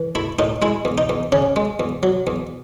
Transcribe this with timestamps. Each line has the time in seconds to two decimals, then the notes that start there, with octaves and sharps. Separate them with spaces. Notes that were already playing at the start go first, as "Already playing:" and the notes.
Already playing: E3
0.15 A3 E4
0.39 A2 D#4
0.62 G#3 E4
0.85 E2
0.98 D#4
1.09 E2
1.32 C#3 C#4
1.56 G#3
1.80 E2
2.03 F#3
2.27 E2